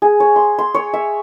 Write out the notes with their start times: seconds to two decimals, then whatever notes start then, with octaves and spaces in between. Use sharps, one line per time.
0.02 G#4
0.20 C#5
0.36 C6
0.59 C6
0.75 C#5
0.93 E5